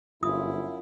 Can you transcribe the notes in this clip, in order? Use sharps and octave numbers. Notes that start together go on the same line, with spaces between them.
G1 F#2 E4 F4 D#6